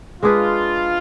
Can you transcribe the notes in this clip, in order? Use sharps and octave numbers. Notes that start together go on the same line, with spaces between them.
G#3 D4 F4 G#4 B4